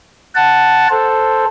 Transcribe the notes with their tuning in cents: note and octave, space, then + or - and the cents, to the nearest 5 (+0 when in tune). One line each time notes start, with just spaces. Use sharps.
F#5 +0 A5 +0
A4 +0 C5 +0